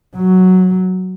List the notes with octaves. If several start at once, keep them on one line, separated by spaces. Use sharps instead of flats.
F#3